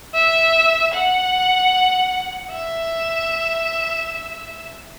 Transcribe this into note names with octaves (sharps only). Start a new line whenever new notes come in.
E5
F#5
E5